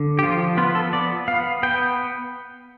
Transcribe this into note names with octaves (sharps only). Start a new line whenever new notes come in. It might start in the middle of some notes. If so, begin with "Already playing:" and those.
Already playing: D3
G4
F3 F4
B3 F4
A4
B3 D5
B3 F5
B3 G5